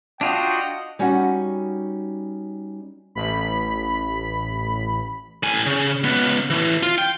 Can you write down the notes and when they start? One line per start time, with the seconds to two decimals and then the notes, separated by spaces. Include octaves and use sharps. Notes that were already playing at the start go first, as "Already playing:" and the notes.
0.21 D4 F4 F#4 D#5 F#5 G5
0.99 G3 C#4 D#4 F#4 F#5
3.15 A1 B5
5.43 A2 G#5
5.66 C#3
6.03 C#2 B3
6.50 A2 E3
6.83 F4
6.98 G5